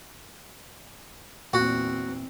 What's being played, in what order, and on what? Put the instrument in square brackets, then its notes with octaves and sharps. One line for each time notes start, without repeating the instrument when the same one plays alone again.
[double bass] E2 C4 [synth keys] A#2 [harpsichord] F#4